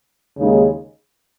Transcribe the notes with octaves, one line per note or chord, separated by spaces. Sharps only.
D#2 C#3 G#3 D#4